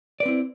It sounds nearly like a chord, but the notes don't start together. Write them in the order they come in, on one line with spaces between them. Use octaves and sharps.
D5 B4 C4 E4